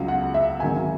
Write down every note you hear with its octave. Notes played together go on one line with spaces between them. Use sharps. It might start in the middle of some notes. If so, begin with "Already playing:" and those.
Already playing: C#2 C#3 F#3
F#5
E5
G#1 G#2 D#3 F#3 G#5